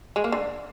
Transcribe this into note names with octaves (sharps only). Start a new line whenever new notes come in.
G#3
A#3
D3